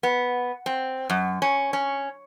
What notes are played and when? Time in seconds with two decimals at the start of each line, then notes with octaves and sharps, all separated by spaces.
0.03 B3
0.66 C4
1.10 F#2
1.42 C#4
1.73 C#4